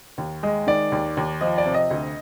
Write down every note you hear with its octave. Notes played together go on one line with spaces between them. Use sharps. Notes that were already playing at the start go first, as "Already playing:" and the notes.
D#2
G#3 D#5
D#3 D5
D#2
D#2
F3 D#5
D5
C3
D#5
D2